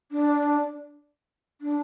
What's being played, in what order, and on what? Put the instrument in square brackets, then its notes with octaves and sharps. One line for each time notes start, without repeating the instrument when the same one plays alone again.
[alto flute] D4
D4